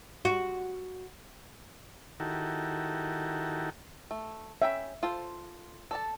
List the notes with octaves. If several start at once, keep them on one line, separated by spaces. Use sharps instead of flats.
F#4
D#3 E4 F#4 G4 A4 A#4
A3
C#4 E5 G5 B5
F4 A4 C5
A4 D5 A5